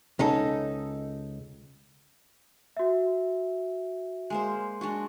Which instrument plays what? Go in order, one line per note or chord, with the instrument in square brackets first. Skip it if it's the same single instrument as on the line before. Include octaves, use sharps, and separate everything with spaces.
[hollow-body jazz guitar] C#2 C#4 D#4 A4
[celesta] F#4 E5
[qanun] G#3 A#3 C5
G#3 D4 F#4